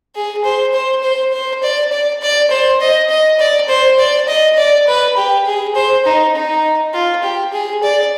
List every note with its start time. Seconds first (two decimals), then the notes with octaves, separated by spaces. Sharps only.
0.15 G#4
0.44 C5
0.73 C5
1.03 C5
1.32 C5
1.63 D5
1.92 D5
2.22 D5
2.50 C5
2.81 D#5
3.09 D#5
3.39 D5
3.69 C5
3.99 D5
4.27 D#5
4.57 D5
4.87 B4
5.17 G4
5.46 G#4
5.75 C5
6.05 D#4
6.34 D#4
6.94 F4
7.23 G4
7.53 G#4
7.83 D5